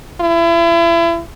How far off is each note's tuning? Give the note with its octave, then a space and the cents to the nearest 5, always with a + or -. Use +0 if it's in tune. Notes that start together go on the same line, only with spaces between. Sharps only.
E4 +35